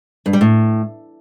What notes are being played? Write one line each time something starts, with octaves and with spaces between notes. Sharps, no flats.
G2
G3
A2